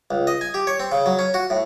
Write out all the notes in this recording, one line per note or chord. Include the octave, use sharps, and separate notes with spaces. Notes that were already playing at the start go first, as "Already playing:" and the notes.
C#2
D#5
G#5
G4
C#5
C4
C#3
F#3
C#4
F#4
A2